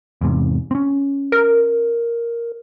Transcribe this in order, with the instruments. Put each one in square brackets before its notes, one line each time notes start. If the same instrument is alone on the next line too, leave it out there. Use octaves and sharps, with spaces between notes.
[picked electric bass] E2 G#2 C3
C4 C#4
[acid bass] A#4